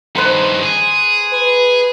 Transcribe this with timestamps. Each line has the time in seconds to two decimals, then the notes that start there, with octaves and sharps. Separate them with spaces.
0.15 G2 D#3 B4 C5 A#5
0.62 G#4
1.32 B4